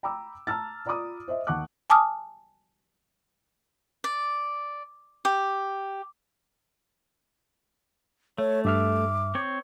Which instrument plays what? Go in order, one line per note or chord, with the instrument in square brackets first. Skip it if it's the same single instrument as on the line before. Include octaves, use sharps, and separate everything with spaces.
[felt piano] G5 A#5 B5 D6 E6
A5 A#5 E6 F6 A6
F4 D5 A#5 B5 D6 D#6
C5 D#5 E5
D#2 F#5 A5 C#6 D6 F#6
[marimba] G#5 A5 D6 D#6 F6
[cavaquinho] D5
G4
[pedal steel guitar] A3 [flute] C#5
[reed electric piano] G2 E5 F6 [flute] D6
[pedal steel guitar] C4 C#5